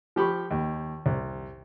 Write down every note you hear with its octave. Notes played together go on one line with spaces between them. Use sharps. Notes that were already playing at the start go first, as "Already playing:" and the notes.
F3 G4 B5 C#6
D#2
C2